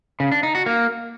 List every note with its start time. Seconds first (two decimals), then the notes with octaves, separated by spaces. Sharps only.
0.20 C#3
0.32 D4
0.43 D#4
0.55 F#4
0.66 A#3